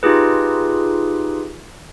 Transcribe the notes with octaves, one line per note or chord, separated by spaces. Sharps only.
D#4 F4 G4 G#4 B4